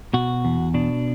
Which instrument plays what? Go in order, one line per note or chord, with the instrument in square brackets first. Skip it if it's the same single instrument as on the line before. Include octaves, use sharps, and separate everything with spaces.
[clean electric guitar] B2 F#4
E2
B2 D4